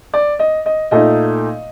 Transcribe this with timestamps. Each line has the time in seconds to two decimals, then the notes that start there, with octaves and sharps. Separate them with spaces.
0.14 D5
0.39 D#5
0.66 D#5
0.91 A#2 A3 D#4 D#5